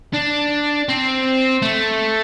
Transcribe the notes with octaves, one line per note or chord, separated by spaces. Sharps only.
D4
C4
A3